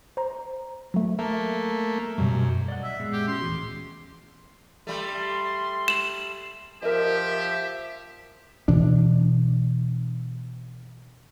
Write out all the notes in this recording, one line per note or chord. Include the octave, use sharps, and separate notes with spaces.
C5 A#5
F#3 A3
A3 A#3 E5
F#2 B2 G3
D5 D#5 F#5
E5
A#2 G#3 B3 G#4
G4
C#4 F#4 C6
D#1 A2 E3 G#4
G3 A3 C6
E7 F#7
F3 G4 A#4 D#5 E5
B2 E3 D4